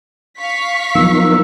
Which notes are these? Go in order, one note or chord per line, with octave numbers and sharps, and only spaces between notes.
F5 C#6 B6
F3 F#3 B3 D#4 A#4 E6